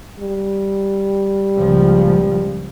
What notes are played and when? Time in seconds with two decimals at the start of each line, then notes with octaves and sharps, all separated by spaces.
0.20 G3
1.59 C#2 A#2 F3